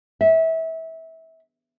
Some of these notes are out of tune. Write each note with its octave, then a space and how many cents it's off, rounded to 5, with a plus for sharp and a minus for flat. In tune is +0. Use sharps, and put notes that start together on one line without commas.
E5 -25